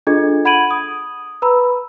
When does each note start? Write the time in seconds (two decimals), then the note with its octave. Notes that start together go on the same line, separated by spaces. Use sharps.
0.07 D4 F4 G#4 A4 D#5 G#6
0.45 F#5 B5 G#6 D7 D#7 F#7
0.71 D#6
1.42 B4 A#5 B5 E6